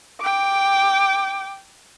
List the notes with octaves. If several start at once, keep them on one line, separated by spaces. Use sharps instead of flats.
G5 D6